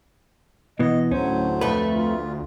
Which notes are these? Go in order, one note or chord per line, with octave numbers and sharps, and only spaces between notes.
B2 E3 B3 D#5
D2 A2 F#3 C#4 C5
F2 A3 B4
F4